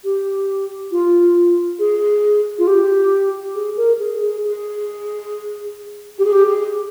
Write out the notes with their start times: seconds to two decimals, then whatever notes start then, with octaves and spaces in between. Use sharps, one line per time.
0.04 G4
0.91 F4
1.79 G#4
2.58 F4
2.67 G4
3.55 G#4
3.77 A#4
3.99 G#4
4.21 G#4
4.43 G#4
6.19 G4
6.25 G#4
6.33 G4
6.47 G#4